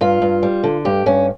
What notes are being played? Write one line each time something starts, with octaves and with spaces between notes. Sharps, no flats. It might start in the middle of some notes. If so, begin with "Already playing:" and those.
G2 F4
G2
G3
D3
G2 G4
G2 C#4